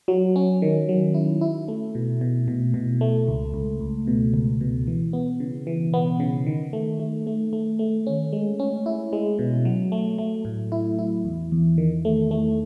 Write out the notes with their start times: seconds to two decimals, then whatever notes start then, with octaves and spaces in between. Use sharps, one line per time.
0.08 F#3
0.36 C#4
0.62 D#3
0.89 F#3
1.14 E4
1.41 E4
1.68 A3
1.95 B2
2.21 B2
2.48 B2
2.74 B2
3.01 A3
3.28 C#2
3.54 C#2
3.81 C#2
4.07 B2
4.34 C#2
4.61 B2
4.87 E3
5.13 B3
5.40 C#3
5.67 E3
5.94 B3
6.20 C#3
6.46 D#3
6.73 A3
7.00 A3
7.27 A3
7.53 A3
7.79 A3
8.07 C#4
8.33 G#3
8.60 C#4
8.86 E4
9.13 G#3
9.39 B2
9.65 F#3
9.92 A3
10.18 A3
10.45 A2
10.72 E4
10.99 E4
11.25 E2
11.52 E2
11.78 D#3
12.05 A3
12.31 A3